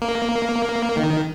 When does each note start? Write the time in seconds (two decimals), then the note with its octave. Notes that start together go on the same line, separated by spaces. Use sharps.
0.02 A#3
0.97 D#3